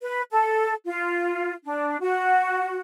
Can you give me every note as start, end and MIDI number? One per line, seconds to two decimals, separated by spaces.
0.02 0.22 71
0.31 0.73 69
0.86 1.53 65
1.65 1.97 62
2.01 2.80 66